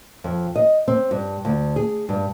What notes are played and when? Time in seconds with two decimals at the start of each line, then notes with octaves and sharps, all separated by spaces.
0.24 F2
0.56 D#5
0.88 C4
1.11 G2
1.45 D2
1.76 G#4
2.09 G2